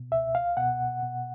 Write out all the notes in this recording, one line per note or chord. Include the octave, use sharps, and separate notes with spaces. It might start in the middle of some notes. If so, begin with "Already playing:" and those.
Already playing: B2
C#2 E5
F5
B2 F#5
B2